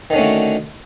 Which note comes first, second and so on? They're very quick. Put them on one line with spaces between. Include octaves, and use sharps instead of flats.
D#3 D3 C#4 A3 F#4